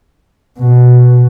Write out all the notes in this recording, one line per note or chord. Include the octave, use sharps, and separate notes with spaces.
B2